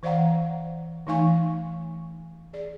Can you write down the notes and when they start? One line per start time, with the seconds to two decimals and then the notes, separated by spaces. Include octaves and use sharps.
0.03 E3 C5 D5 F5 F#5 A#5
1.07 E3 A3 D#4 F5 G#5 C#6
2.53 G#4 D5